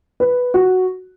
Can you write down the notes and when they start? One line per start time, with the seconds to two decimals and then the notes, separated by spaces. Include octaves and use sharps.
0.20 B4
0.54 F#4